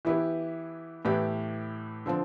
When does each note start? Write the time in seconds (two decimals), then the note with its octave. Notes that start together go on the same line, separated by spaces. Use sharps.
0.05 E3 B3 E4 G4 B4
1.05 A2 E3 B3 E4 G4
2.06 D3 F3 C4